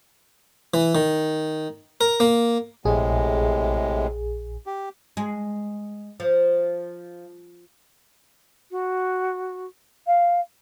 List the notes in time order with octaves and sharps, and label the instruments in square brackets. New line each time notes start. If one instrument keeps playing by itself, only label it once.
[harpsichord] E3
D#3
A#4
A#3
[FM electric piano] A#1 G#4 [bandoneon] A2 C3 G#3
[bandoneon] G4
[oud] G#3
F3
[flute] F#4
F5